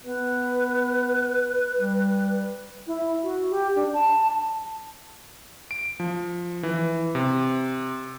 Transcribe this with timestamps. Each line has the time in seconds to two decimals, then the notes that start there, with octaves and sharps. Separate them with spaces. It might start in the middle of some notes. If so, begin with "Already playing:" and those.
0.04 B3 B4
1.79 G3
2.87 E4
3.23 F#4
3.50 G4
3.76 D4
3.93 A5
5.71 D7
6.00 F3
6.63 E3
7.15 C3